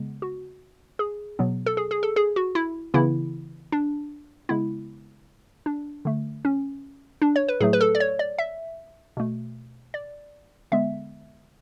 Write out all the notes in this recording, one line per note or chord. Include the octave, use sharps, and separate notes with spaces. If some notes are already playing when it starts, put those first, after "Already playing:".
Already playing: C#3 G#3 B3
F#4
G#4
B2 F#3 B3
A4
G#4
G#4
A4
G#4
F#4
E4
C#3 E3 B3 E4
D4
C#3 G#3 B3 E4
D4
D3 A3
C#4
D4
C#5
B4
A2 F#3 A3 G#4
B4
A4
D5
C#5
D5
E5
B2 A3
D5
D3 G#3 B3 E5